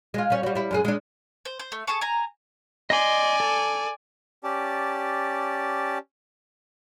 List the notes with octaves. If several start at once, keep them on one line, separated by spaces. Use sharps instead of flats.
G#3 F4
G3 C#4
G3 F#4
G3 E4
F#2 G#3 G#4
G#3 D4
C5
C5
A3
G#4 A4 A5 C#6
G#5 A#5
D5 D#5 G#5 C6
A4
C#4 G4 D5 A5